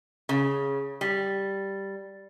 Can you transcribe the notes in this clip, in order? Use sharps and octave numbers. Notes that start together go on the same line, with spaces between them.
C#3
G3